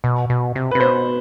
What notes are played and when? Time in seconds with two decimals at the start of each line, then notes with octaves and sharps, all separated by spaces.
0.04 B2
0.30 B2
0.55 C3
0.71 C3 B4
0.80 B2 C5